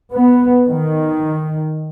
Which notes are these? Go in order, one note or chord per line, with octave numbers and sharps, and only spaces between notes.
B3
D#3